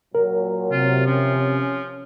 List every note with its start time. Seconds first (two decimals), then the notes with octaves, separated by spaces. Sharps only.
0.15 A#2 F#3 A#4
0.72 C3 F4
1.06 F3 C#4